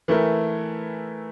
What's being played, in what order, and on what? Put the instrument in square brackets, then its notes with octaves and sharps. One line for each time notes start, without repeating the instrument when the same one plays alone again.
[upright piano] E3 A3 E4 A#4